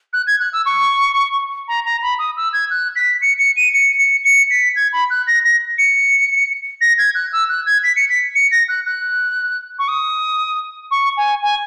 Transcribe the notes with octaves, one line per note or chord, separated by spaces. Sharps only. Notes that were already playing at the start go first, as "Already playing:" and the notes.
F#6
G#6
F#6
E6
C#6
A#5
A#5
B5
D#6
E6
G#6
F#6
B6
C#7
C#7
D#7
C#7
C#7
C#7
B6
G#6
B5
F#6
A#6
A#6
C#7
A#6
G#6
F#6
E6
F#6
G#6
B6
C#7
B6
C#7
A#6
F#6
F#6
C#6
D#6
C#6
G#5
G#5